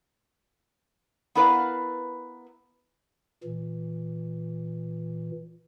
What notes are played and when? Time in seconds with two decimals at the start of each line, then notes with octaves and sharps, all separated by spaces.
1.35 B3 E4 A#4 B4 D5 F5
3.44 A#2 E3